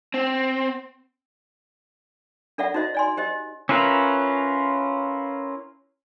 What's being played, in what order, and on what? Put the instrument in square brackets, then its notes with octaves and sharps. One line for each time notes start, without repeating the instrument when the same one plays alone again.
[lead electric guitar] C4
[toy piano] D4 A4 D5 E5 F#5
D#4 F#4 C5 D#5 E5
D5 G#5 C6
G4 C5 D#5
[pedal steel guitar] C#4 E4 F4 A#4 B4